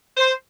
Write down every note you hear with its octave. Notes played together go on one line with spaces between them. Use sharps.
C5